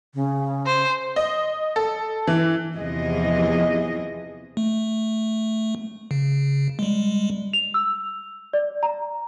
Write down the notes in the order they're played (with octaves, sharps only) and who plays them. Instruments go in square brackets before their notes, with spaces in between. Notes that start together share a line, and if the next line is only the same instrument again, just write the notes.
[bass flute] C#3
[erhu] C5
[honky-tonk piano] D#5
A4
E3
[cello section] E2 C3 E3 F3 G#4 D#5
[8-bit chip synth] A3
C#3
G3 G#3
[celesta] F7
E6
D5
A#5